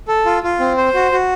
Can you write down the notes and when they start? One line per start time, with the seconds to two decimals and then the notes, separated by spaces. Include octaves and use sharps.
0.08 A4
0.26 F4
0.43 F4
0.60 C4
0.77 C5
0.94 F#4
1.12 F#4